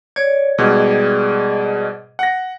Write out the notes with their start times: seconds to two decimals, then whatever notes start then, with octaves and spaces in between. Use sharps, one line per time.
0.16 C#5 D5 G#6
0.58 G#2 B2 G3 G#4 D5
2.19 F#5 A#6